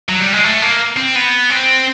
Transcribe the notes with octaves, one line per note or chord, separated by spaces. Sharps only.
F#3
G3
G#3
A3
A#3
C4
B3
C4